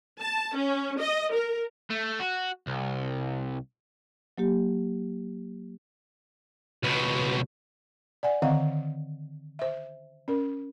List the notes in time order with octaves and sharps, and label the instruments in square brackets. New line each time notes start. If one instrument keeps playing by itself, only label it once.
[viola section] A5
C#4
D#5
A#4
[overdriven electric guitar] A3
F#4
C2
[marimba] F#3 A#3 G4
[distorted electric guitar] C#2 B2
[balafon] D5 F#5 G#5
D3 D#3 C4 D#5 F5 F#5
C5 E5
C#4 A#4